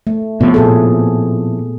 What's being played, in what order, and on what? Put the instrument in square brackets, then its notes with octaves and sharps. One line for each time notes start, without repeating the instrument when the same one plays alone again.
[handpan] A3
[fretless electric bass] A2 C3 F3 [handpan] B3
[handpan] A#2 G#4 A4